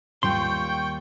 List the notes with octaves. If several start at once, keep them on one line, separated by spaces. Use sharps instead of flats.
D#2 G3 F4 G5 C6 C#6 G6